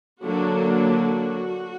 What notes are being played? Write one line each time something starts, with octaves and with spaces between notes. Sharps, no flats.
D3 F#3 A#3 D4 F#4
F#4